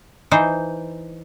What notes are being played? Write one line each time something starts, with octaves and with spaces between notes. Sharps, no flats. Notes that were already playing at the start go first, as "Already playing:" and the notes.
E3 D#4 C5